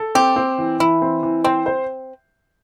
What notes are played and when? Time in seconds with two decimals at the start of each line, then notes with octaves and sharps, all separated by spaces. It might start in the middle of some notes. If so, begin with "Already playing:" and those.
Already playing: A4
0.15 C4 G4
0.36 C4
0.58 E3
0.80 E3 E4
1.02 C4
1.23 E3
1.44 C4 C5
1.66 C5